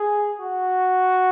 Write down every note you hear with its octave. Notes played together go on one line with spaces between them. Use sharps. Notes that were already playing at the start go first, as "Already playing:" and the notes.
Already playing: G#4
F#4